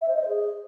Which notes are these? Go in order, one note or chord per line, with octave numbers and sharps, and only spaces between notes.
E5
C5
D#5
C5
G#4